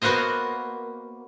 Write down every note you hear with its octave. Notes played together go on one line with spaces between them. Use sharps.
A#3 B3 F#4 A#4 C5 D#5